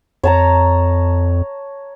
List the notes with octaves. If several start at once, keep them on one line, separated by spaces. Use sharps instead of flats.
F2 C#5 A5 A#5